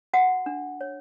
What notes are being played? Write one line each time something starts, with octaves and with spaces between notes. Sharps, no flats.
F#4 F#5
D4
C#5